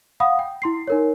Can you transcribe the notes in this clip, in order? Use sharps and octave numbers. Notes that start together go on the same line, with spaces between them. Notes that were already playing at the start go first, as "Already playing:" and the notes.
F5 F#5 B5 D#6
G5
E4 C6 C7
D#4 A#4 C#5